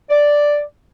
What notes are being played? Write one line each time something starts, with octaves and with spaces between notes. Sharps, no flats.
D5